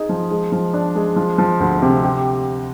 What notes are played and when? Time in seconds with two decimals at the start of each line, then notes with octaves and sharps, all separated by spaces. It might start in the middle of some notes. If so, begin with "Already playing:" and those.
Already playing: D#4 G#4
0.09 F3
0.31 G#3
0.52 F3
0.74 D4
0.95 G#3
1.16 F3
1.38 F3
1.60 D2
1.82 C3
2.04 G4